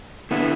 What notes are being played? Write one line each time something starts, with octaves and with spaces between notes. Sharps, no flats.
D3 B3 E4